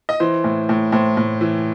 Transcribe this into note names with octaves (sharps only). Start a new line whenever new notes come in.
D#5
E3 C5
A2
A2
A2 C5
A2
E3